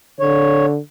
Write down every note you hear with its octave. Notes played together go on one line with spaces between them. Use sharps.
D3 C#5